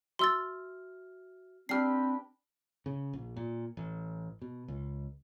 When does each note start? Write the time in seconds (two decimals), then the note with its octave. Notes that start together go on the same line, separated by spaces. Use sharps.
0.19 F#4 E5 C6 E6 F6 A6
1.69 C4 D4 G4 B4 F6 C7
2.86 C#3
3.13 A#1
3.37 A#2
3.77 A1
4.42 B2
4.68 C#2